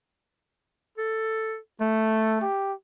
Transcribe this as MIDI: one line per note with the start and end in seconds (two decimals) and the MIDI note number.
0.98 1.57 69
1.81 2.44 57
1.81 2.37 69
2.42 2.73 67